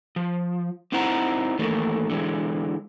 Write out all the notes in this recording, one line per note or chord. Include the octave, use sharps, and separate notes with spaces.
F3
C4 D#4 E4 C5 F#5 A#5
D#3 E3 A3 A#3
D3 E3 G#3